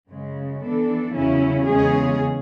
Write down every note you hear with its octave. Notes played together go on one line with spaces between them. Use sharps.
F#2 C#3 G#3
E3 B3 D4 A4
E2 C#3 F#3 C#4 E4
E2 C#3 G#3 C#4 G#4